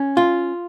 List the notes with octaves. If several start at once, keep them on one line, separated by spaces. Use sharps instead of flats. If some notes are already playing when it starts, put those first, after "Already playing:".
Already playing: C#4
F4